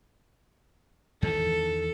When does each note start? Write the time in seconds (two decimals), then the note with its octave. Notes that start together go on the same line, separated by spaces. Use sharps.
1.22 E2 D#3 E3 A4